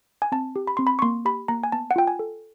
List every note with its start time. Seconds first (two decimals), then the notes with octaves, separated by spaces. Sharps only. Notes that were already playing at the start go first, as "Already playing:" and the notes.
0.22 G#5
0.32 C4 A5
0.56 G4
0.67 B5
0.77 C4 C6
0.87 B5
0.99 C#6
1.02 A#3 C6
1.25 G4 B5
1.48 A#3 A#5
1.64 G#5
1.72 B3 A5
1.91 F#5
1.96 F4 G5
2.07 G#5
2.19 A4